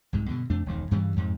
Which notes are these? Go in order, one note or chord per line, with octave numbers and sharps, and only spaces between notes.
C2 G#2 C3
G2 B2 D3
F2 C3 A3 D4
E1 C#2 D#3
G2 C#3 E3 G3
F2 G#2 C3